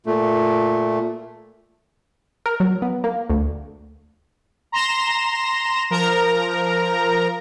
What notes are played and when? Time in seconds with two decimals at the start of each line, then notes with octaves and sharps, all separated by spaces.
0.06 A#2 A3
2.46 A#4
2.60 F#3
2.82 B3
3.04 A#3
3.30 D2
4.72 A#5 C6 A#6 E7
5.90 F3 A#4 A#5